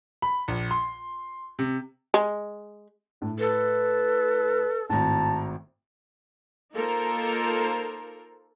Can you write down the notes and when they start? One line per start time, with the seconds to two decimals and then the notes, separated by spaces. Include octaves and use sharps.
0.22 B5
0.48 A#1
0.71 C6
1.59 C3
2.14 G#3
3.22 A2 D4
3.39 A4 B4
4.90 G#1 A2 A5 A#5
6.73 A#3 D#4 F4 A4 A#4 C5